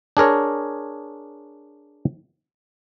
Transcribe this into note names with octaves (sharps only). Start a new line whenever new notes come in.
D4 G#4 A#4 C#5